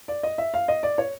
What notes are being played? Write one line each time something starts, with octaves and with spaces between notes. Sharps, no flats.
D5
D#5
E5
F5
D#5
D5
C#5